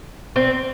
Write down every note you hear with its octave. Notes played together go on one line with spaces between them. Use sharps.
C4